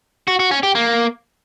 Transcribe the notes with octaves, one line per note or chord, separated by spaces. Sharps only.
F#4
F#4
C#4
G4
A#3